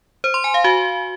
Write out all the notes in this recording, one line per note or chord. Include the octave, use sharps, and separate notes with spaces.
C5
C6
G#5
F5
F#4